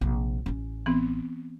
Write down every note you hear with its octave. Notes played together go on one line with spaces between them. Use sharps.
A#1 C3
A1 C#4
E3 B3 C4